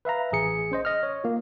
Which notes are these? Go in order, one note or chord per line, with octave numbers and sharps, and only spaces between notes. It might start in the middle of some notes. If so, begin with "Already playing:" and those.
B4 E5 F5 A#5
A1 G#4 C#7
C#4 C5 D#5
D#5 F6
C#5
A#3 F4